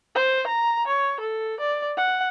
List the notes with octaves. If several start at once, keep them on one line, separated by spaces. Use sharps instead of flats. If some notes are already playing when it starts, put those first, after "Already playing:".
C5
A#5
C#5
A4
D5
F#5